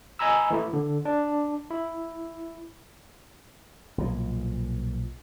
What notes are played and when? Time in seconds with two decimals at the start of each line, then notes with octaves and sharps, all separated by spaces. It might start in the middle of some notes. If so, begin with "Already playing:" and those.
0.19 D#5 G#5 A#5 B5 E6
0.51 E3 A3 E4
0.73 D3
1.05 D4
1.71 E4
3.98 B1 A#2 F3